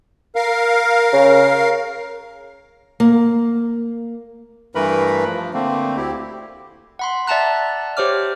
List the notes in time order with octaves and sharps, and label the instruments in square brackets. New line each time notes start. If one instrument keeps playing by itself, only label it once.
[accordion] A#4 F5
[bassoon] C#3
[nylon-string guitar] A#3
[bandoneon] G2 E3 A3 A#4 B4 B5
F3
D3 A3 A#3 C4
D2 E4 G4
[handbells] F#5 B5 C6
D5 E5 F#5 A5 A#5 F#6
G4 C5 C#5 D6 F6